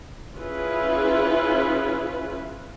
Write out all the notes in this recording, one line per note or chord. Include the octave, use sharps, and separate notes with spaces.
C#4 E4 F4 G#4 B4